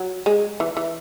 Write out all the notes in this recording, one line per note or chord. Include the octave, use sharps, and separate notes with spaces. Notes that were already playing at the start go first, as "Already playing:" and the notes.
Already playing: F#3
G#3
E3
E3